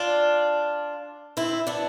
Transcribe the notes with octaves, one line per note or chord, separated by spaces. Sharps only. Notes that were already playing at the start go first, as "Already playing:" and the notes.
Already playing: D4 F4
C4 E4
B3 D4